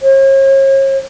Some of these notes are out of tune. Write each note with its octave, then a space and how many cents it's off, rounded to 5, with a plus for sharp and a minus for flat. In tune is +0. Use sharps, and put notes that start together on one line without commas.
C#5 -40